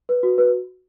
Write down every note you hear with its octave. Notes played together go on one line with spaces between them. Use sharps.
B4
F#4
B4